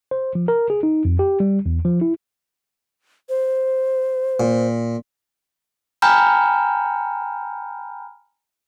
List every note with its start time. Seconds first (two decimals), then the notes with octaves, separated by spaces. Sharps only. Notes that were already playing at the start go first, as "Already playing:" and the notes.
0.11 C5
0.35 F3
0.48 A#4
0.70 G#4
0.83 D#4
1.05 F2
1.19 G4
1.40 G3
1.66 E2
1.85 F3
2.01 E4
3.29 C5
4.40 A#2
6.02 G5 G#5 A#5 B5 F6 G6